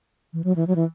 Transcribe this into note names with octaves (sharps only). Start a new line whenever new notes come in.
E3
F#3
E3
F#3
E3